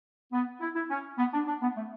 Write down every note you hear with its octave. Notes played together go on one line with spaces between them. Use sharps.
B3
E4
E4
C#4
B3
D4
D4
B3
A3